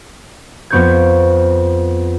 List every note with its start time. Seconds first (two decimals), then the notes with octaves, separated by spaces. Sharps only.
0.70 F2 B3 C4 C#6 G6 G#6